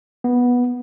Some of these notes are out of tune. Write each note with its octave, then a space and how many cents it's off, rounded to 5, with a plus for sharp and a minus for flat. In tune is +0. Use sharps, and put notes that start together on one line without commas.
B3 -10